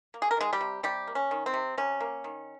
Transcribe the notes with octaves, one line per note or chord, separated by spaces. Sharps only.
A#3
G#4
A#4
D#3 G#3 G#4
G3 G4
C3
C3 G3 G4
A#3
C#4
D#3
C4
C3
C3 C#4
A#3
D#3